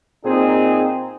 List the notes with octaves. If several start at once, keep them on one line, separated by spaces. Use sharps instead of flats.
A#2 C4 D#4 G#4